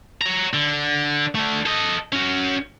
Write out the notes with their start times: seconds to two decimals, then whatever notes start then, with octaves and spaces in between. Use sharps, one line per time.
0.21 C#5 A#5
0.54 D3
1.35 D3 A3
1.66 A4 D#5
2.12 C#4 F#4